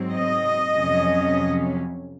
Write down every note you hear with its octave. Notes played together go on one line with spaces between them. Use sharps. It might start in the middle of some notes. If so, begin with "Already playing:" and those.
Already playing: G#2 F#3 C4
D#5
F2 C3 F#3 C#4